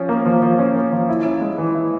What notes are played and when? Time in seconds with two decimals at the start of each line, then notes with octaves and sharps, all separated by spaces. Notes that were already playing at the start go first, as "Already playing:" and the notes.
Already playing: F3 C#4
0.09 A#3
0.26 F3
0.42 F3
0.59 C#4
0.75 A#3
0.92 F3
1.08 E4
1.25 C#4
1.41 G#3
1.58 E3
1.74 E4